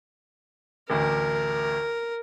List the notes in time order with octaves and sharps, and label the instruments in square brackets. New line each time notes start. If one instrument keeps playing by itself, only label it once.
[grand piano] A1 D2 [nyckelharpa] A#4